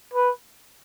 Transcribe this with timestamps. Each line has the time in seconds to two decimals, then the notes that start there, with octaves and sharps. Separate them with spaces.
0.14 B4